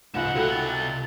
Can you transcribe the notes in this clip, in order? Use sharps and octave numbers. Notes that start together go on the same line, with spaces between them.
C#2 G#2 F#5 E7
C3 F#4 A4 G5 B5
A6